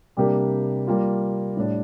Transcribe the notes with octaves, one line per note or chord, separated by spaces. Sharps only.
C3 G3 A#3 D4 G4
G3 A#3 F4
A2 G3 D4